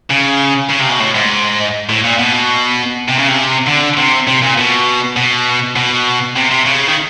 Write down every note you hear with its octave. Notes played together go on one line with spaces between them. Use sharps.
C#3
C#3
C3
B2
A2
G#2
A2
A#2
B2
C3
C#3
C3
D3
C3
C3
A#2
B2
B2
B2
C3
C3
C#3
D#3